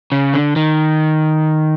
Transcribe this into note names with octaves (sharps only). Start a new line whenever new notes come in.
C#3
D3
D#3